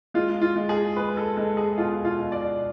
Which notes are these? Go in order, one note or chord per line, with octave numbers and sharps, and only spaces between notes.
G#3 F4
F4
G#3
G#4
G#3 B4
A4
G#3 A4
G#4
B2 F4
F4
B2
D5